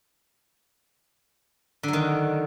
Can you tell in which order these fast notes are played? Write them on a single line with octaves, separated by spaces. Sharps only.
D3 F#3 D#3